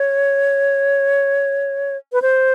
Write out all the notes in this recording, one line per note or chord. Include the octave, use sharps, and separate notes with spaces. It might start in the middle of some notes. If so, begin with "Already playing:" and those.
Already playing: C#5
B4
C5